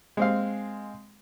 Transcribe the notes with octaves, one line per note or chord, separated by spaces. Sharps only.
G#3 C4 F5